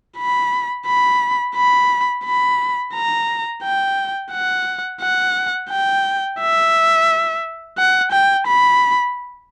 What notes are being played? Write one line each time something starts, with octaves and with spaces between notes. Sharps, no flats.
B5
B5
B5
B5
A#5
G5
F#5
F#5
G5
E5
F#5
G5
B5